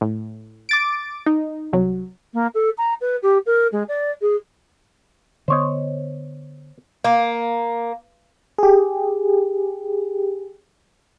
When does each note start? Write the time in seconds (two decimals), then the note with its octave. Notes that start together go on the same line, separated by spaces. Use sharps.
0.01 A2
0.69 D6 A6 D7
1.26 D#4
1.73 C2 F#3
2.34 A#3
2.54 A4
2.78 A#5
3.01 B4
3.22 G4
3.46 A#4
3.72 G#3
3.88 D5
4.22 G#4
5.48 D3 B3 C5 C#5 D#5
7.04 A#3
8.58 G4 G#4